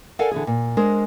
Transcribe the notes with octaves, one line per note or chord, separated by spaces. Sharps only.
A4 A#4 D5 F5 F#5 G#5
D3 E3 G#4
A#2
G#3 D4 A#4 C5